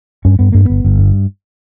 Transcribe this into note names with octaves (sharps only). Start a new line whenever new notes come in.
G2 C#4
G2 B3
G2 A#3
G1 B3
G1
G2